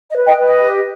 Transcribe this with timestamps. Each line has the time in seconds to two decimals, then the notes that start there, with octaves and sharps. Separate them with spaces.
0.10 D#5
0.16 B4
0.27 D#5 G5
0.38 B4
0.44 D#5
0.60 G4